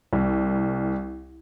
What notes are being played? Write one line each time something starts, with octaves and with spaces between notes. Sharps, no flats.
C2